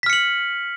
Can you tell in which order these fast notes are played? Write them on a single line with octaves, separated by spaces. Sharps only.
B6 F6 C#7 F#7